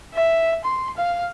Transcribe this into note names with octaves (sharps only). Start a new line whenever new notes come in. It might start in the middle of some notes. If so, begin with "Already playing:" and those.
E5
C6
F5